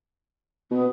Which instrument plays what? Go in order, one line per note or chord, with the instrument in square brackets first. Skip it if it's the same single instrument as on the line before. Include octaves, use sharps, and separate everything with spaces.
[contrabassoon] B2 [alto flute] B3